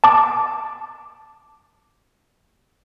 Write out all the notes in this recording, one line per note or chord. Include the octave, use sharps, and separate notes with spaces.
A5 D6